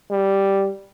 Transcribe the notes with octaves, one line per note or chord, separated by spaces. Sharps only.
G3